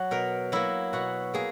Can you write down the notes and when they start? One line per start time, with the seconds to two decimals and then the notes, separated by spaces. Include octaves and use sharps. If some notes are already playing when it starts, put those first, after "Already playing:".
Already playing: F#3 F#4
0.11 B2 A#4
0.52 F#3 A#3 E4
0.93 B2 F#4
1.34 A#3 G#4